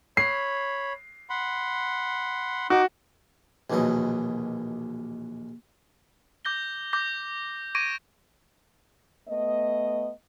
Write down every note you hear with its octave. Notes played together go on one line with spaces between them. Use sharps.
C#5 B5 C7
F#5 B5 C6
D#4 F#4 D6
A#1 D#2 B2 E3 F#3 D#5
D6 G6 A#6 G7
D6 G6 A#6
C#6 D6 G#6 A#6 D7 D#7
A3 B3 D#5